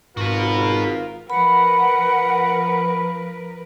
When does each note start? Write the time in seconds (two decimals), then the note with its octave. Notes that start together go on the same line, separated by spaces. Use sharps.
0.17 G#1 G#2 F4 F#4 A#4 B4
1.30 F3 A#4 B4 F#5 B5